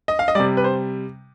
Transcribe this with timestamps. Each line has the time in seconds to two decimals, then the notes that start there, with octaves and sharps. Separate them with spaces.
0.08 D#5
0.19 F5
0.28 D#5
0.35 C3 G3 D5
0.57 B4
0.64 C5